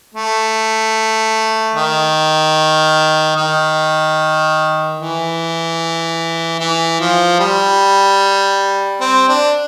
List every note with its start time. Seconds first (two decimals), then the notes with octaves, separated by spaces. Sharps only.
0.14 A3
1.75 D#3
3.36 D#3
4.98 E3
6.59 E3
7.00 F3
7.39 G3
9.01 C4
9.28 D4